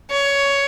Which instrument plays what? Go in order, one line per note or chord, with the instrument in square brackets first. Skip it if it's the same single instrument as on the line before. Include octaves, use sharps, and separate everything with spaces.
[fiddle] C#5